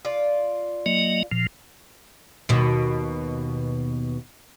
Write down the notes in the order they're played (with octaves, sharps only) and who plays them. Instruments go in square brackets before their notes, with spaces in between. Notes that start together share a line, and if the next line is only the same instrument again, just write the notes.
[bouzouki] F4 D5
[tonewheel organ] F#3 A#3 D#5
A#2 F3
[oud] D#2 B2